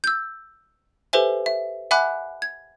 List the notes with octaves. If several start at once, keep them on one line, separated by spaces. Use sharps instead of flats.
E6 G6
G4 A4 B4 C5 E5 G#5
E5
E5 F#5 G#5 B5 D6 F#6
G#6